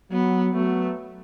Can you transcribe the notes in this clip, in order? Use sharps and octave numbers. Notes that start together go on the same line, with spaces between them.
F#3 B3
F#3 A3 B3